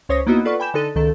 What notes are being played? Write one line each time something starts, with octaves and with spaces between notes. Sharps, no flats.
C#2 C#4 C5 C#5 D#6 A#6
A#3 B3 D#4 E4 F#4 D#5
F4 A4 B4 D5 F#5 C#6
G5 G#5 B5 D6 G6 E7
D3 D#4 A4 D#7
C#2 D#3 A4